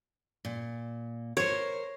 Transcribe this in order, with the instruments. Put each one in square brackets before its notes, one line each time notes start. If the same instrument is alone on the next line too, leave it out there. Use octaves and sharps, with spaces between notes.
[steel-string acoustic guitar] A#2
[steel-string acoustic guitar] A#4 C5 [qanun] C#5